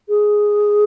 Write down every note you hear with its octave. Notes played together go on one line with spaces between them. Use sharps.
G#4